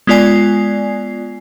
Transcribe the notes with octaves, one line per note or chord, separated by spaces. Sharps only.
G#3 B3 F4 D5 G#5 C7